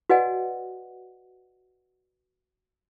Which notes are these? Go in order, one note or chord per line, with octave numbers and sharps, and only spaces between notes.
F#4 B4 D5 D#5 F#5 G#5